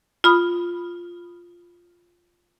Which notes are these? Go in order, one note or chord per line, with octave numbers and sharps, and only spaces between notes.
F4 B5 D#6